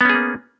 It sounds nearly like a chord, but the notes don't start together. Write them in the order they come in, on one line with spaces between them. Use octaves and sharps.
B3 C#4 G#4 A#3